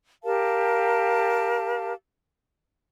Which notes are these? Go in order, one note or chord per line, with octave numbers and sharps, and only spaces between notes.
G4 A#4 F5 A5